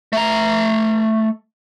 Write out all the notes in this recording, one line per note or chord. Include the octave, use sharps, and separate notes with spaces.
A3 A#5